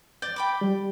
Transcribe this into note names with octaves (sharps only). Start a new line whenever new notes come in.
D5 G6
G5 B5 D6
G3